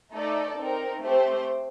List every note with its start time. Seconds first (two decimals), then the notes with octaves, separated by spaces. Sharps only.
0.13 A3 D#4 A4 D5
0.58 C4 D#4 A#4
1.02 A3 C4 G4 C5